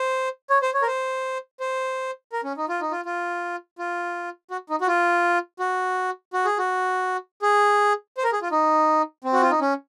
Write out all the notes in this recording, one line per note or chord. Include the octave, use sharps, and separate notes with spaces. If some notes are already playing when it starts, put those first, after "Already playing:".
Already playing: C5
C#5
C5
C#5
A#4
C5
C5
A#4
C#4
D#4
F4
D#4
F4
F4
F4
F#4
D#4
F#4
F4
F#4
F#4
G#4
F#4
G#4
C5
A#4
G#4
F4
D#4
C4
F#4
F4
D#4
C#4